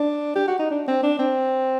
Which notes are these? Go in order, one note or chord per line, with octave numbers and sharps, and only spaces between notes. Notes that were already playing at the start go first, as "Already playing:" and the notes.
Already playing: D4
G4
F#4
D#4
D4
C4
D4
C4